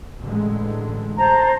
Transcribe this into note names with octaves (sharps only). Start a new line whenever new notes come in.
A1 D3 G#3
C5 A5 A#5